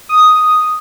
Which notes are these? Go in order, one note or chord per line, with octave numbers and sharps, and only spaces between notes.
D#6